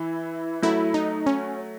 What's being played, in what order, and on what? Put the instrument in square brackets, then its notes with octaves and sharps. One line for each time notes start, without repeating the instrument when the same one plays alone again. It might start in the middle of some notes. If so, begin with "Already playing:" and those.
Already playing: [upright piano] E3 [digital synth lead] E4
[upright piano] F#3 A3 [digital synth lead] E4
[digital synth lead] D#4
C#4